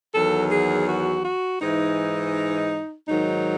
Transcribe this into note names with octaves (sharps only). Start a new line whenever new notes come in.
E2 D#3 F#3 A4
G#4
F#4
F#4
G#2 E3 D#4
G#2 D#3 F#3 D#4